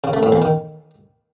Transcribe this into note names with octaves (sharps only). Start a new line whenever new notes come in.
C#3
A3
A2
E2
D#3